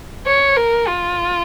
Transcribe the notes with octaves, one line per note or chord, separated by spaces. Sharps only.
C#5
A#4
F4